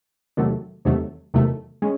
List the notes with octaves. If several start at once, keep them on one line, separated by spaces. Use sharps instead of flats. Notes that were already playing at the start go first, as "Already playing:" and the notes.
E2 C3 D#3 F#3 A3
E2 C3 D#3 F#3 A3
E2 C3 D#3 F#3 A3
G#3 C#4